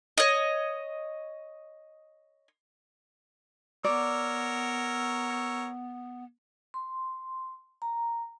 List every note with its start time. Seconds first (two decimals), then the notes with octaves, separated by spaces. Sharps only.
0.18 C#5 D#5
3.84 B3 A#4 C#5 D5 E6
6.74 C6
7.82 A#5